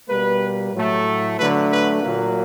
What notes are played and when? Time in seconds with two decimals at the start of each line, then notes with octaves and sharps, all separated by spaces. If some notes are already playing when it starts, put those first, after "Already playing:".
0.09 B2 G3 A#3 B4
0.74 A2 F#3 A3
1.38 D3 F#3 A3 B4
1.71 B4
2.03 A#2 F#3 A#3